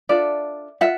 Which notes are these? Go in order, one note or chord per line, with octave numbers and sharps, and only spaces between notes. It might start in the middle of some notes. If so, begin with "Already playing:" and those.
D4 F4 A4 D5 E5
F4 E5 F#5